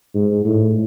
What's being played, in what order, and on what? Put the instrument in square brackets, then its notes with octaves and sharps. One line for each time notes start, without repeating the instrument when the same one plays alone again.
[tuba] G#2
A2